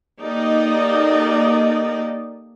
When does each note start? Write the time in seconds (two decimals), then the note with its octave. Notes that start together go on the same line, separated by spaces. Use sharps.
0.21 A#3 D#4 G4 A4 D5 D#5